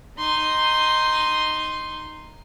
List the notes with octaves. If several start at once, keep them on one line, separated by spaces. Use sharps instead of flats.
D#4 C6